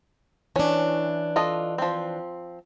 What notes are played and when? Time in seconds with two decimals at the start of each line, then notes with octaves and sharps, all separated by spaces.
0.56 E3 C#4 D4 C#5
1.36 F4 A4 D#5
1.78 F3 C4